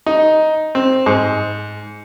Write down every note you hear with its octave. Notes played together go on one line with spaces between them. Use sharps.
D#4
C4
G#2